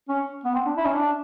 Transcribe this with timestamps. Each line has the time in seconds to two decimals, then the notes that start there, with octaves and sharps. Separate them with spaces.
0.08 C#4
0.45 B3
0.54 C4
0.66 D4
0.77 E4
0.85 C#4
0.94 D4